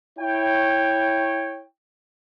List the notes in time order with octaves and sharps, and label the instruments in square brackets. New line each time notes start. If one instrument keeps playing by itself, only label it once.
[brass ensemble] E4 C#5 G5